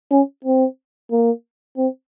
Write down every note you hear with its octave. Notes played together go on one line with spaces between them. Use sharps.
C#4
C4
A#3
C4